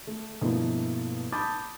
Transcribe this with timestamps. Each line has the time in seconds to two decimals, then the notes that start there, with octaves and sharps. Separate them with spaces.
0.07 A3
0.41 G2 B2 F3 A3 A#3 E4
1.32 A5 B5 D6 D#6 G6 A6